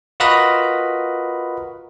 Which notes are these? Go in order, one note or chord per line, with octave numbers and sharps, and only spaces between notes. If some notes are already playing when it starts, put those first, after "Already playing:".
F4 F#4 A#4 B4 D#5 B5